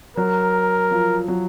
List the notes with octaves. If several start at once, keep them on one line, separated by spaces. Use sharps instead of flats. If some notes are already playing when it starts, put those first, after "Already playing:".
F#3 A#4
F3
F#3